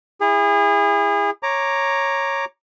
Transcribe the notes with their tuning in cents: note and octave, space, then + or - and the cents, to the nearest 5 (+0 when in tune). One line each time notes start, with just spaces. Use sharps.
E4 +0 G#4 -30
C#5 -10 A#5 +0 D6 +0